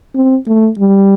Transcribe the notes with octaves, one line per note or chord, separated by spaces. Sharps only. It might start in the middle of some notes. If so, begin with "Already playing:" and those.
C4
A3
G3